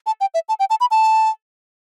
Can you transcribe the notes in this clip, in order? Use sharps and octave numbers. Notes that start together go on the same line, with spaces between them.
A5
G5
E5
A5
G5
A5
B5
A5